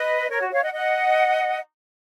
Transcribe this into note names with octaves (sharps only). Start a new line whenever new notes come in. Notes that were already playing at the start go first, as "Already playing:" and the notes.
Already playing: B4 D#5
A#4 C#5
F#4
C#5 F5
D#5 F#5
D#5 F#5